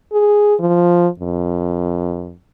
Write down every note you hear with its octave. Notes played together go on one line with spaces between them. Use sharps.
G#4
F3
F2